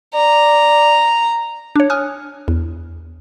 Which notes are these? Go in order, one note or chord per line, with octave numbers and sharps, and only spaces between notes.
D5 A#5
D4 C#5
G#5 D#6 F6 F#6
E2